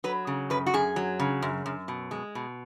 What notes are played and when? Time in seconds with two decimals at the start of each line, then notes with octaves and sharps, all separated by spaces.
0.04 F#3 B4
0.27 C#3
0.50 F#2 B4
0.67 F#4
0.74 F#2 G#4
0.96 F#3
1.20 C#3
1.42 F#2
1.66 F#2
1.88 B2
2.11 G#3
2.35 B2